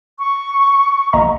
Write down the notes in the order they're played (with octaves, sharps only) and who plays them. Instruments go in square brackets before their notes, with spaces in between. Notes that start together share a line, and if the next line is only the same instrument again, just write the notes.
[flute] C#6
[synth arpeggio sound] A#1 D#5 A#5